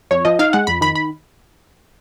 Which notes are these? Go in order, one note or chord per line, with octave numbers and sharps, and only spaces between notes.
F2 C#5
F3 D#5
D#4 F5
G#3 F#5
F2 B5
D#3 B5
B5